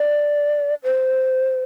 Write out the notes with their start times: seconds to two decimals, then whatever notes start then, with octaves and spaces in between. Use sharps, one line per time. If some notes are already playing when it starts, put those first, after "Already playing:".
Already playing: D5
0.84 C5